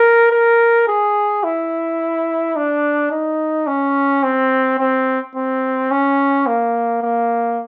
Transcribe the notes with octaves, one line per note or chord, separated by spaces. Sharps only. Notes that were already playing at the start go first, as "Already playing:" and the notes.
Already playing: A#4
A#4
G#4
E4
D4
D#4
C#4
C4
C4
C4
C#4
A#3
A#3